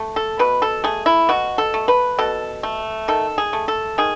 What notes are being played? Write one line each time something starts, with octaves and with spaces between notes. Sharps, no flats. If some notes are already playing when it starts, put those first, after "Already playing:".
Already playing: A3
A4
B2 B4
A4
A3 G#4
E4
B2 F#4
A4
A3
B4
B2 A4
A3
D#3 A4
G#4
A3
A4
D#3 G#4